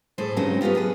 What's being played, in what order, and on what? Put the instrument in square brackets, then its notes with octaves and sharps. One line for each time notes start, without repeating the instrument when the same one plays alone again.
[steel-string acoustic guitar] A2 C4 G#4 A4 C5
G2 C#3 F#3 G#3 C4 D#4
A3 B3 D#4 F4 G4
F#2 G#4 B4